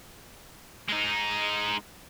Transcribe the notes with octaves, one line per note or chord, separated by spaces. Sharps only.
G#3 D#4